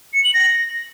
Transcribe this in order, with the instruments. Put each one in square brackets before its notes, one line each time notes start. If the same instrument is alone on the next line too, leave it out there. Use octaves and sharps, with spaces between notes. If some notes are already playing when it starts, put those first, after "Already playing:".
[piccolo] C#7
F#7
A#6